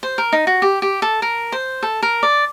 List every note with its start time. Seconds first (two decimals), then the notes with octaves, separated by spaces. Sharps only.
0.03 C5
0.18 A#4
0.32 D#4
0.47 F#4
0.62 G4
0.82 G4
1.02 A4
1.22 A#4
1.52 C5
1.83 A4
2.02 A#4
2.23 D5